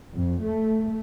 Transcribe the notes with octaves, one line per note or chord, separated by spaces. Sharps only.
F2
A3